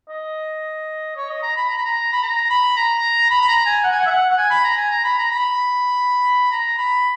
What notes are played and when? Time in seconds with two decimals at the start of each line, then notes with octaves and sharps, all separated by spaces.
0.09 D#5
1.16 C#5
1.30 D#5
1.43 A#5
1.56 B5
1.70 A#5
1.77 B5
1.85 A#5
2.12 B5
2.23 A#5
2.50 B5
2.77 A#5
3.30 B5
3.41 B5
3.48 A#5
3.66 G#5
3.84 F#5
3.92 G#5
4.00 F#5
4.06 E5
4.10 F#5
4.30 F#5
4.37 G#5
4.50 B5
4.64 A#5
4.77 G#5
4.90 A#5
5.04 B5
5.18 A#5
5.31 B5
6.51 A#5
6.78 B5